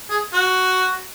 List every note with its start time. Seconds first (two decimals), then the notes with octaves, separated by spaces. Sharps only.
0.10 G#4
0.33 F#4